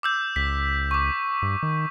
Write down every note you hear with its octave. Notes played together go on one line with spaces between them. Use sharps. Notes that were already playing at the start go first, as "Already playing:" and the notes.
D6 E6 G6
C#2 B6
C#6 D6
G2
D#3